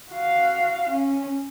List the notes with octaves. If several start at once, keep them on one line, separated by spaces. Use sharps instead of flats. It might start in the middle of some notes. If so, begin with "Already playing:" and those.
F#4 F5
C#4